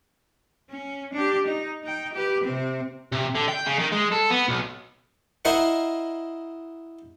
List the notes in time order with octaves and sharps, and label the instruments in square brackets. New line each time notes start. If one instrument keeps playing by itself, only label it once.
[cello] C#4
D4 G4
D#4
D#4 G5
G4 B4
C3 C4
[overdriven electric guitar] C3
D3
G5
C#3
D#3
G#3
A4
B3
B1
[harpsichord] E4 A#4 C5 D#5 F#5